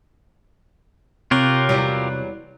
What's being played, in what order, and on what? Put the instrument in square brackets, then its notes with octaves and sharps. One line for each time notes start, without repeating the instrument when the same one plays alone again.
[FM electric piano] C3 C#5 F#6 [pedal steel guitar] F4 G4 A#4
[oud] E2 F#3 G3